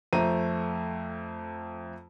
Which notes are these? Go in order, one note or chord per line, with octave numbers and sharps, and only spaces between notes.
F2 A3 C5 A#5 D#7